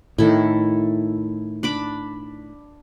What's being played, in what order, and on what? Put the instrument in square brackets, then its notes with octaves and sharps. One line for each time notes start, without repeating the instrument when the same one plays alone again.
[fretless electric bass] A2 D#3 [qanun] E4 A4
[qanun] D4 B5 D6